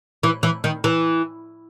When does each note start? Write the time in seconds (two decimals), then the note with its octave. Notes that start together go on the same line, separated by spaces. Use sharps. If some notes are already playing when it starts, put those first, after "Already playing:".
0.23 E3
0.43 E3
0.64 D#3
0.84 E3